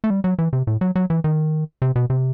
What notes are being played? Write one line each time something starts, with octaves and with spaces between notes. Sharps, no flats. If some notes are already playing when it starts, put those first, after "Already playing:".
A3
G3
F#3
E3
C3
A2
F#3
F#3
E3
D#3
C3
B2
C3